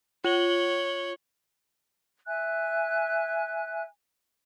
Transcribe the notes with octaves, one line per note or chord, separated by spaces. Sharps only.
F4 C#5 F#7 G7
E5 G#5 F#6